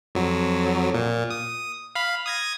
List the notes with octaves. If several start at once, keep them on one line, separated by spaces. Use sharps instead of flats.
F2 F#3
A#2
D#6
F5 B5
D#6 G#6 A#6